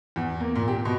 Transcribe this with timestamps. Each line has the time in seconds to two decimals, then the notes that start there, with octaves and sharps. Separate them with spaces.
0.16 E2
0.40 A#3
0.56 A#2
0.68 G4
0.85 B2